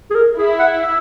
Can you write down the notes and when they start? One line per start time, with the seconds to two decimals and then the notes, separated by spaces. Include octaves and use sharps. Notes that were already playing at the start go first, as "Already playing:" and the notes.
0.10 G#4
0.15 A#4
0.38 E4 G#4
0.59 F#5
0.83 E5